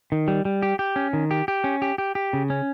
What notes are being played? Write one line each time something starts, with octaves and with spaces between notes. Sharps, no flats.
D#3
G3
G3
G4
G4
C#4
D#3
G4
G4
C#4
G4
G4
G4
C#3
C#4